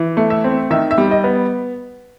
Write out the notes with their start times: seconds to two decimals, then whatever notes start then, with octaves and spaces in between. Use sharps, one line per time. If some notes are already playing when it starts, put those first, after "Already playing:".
Already playing: E3
0.17 A3
0.30 E5
0.44 C4
0.70 D#3 E5
0.91 E5
0.98 G3
1.11 D#5
1.24 B3